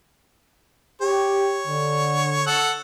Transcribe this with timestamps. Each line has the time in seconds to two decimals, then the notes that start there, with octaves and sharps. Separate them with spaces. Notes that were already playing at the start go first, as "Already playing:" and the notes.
1.02 G4 C#5
1.66 D3
2.47 A4 F#5